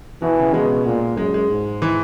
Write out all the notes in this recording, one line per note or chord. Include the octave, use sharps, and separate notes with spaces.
B2 E3
C#3
B2 G#3
A#2
F#2 G#3
G#3
G#2
E3